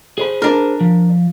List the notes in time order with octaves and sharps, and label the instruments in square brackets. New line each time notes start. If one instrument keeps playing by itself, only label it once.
[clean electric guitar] G#4 C5 B5
[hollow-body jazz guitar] D4 A#4
[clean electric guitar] F3